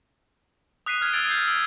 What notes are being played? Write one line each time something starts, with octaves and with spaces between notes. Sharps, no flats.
D#6 F#6 B6 C7 D#7
F6 G#6 B6
D#6 E6 G#6 A6 D7
G6 C7 D7
E6